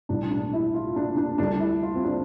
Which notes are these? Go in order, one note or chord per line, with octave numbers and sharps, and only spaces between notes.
B1 A2 E3 G3 D4
D4
E4
F4
D4
D4
D2 D3 G3 D4
E4
F4
C4
D4